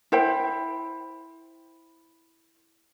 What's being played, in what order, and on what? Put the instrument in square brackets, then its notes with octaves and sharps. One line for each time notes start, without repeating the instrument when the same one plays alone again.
[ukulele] E4 C5 G5